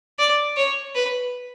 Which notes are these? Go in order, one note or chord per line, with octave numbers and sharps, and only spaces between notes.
D5
C#5
B4